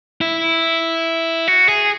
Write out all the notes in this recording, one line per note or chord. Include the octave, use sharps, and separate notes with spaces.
E4
F#4
G#4